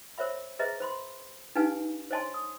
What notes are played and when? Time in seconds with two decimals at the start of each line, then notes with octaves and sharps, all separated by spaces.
0.18 A#4 C5 C#5 E5 B5
0.59 G#4 B4 C5 D#5 E5 A#5
0.80 C5 B5 C6
1.55 D4 D#4 G4 B4 F5 G#5
2.11 C5 C#5 D#5 G#5 A5 C6
2.34 D#6